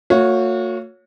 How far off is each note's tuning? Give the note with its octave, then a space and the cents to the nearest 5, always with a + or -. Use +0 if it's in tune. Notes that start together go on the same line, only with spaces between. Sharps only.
A#3 -45 F#4 -40 C#5 +0